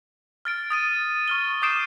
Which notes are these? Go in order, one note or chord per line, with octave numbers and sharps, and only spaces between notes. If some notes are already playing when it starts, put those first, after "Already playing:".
F6 A6 D7
D#6 A6 D#7
C#6 F6 G7
D6 D#6 G6 C7 D7 E7